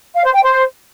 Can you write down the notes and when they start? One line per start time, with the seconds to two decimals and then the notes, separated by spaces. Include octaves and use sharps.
0.14 F5
0.24 C5
0.33 G5
0.42 C5